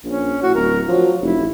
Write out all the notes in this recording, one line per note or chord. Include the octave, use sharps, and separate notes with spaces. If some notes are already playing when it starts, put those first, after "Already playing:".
A#1 C#4
A2 F#4
D1 A#4
F3 F#3
F1 E4
A1